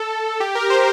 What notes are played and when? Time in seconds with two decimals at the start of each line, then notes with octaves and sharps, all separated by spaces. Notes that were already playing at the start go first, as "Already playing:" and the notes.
Already playing: A4
0.40 G4
0.55 A#4
0.70 C5